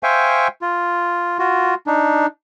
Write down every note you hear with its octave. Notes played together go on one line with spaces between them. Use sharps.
C5 E5 F5 G5 G#5 C#6
F4
F4 F#4
D4 D#4